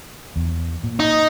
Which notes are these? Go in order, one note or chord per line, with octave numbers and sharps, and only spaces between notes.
E2
A#2
D#4